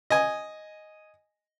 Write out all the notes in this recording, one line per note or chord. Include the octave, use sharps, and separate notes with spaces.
D#5 G#5